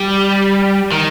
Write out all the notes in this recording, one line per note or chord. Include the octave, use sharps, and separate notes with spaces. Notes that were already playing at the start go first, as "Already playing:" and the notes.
Already playing: G3
D#3